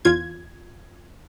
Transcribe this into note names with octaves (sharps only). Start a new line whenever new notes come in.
E2 F4 G#6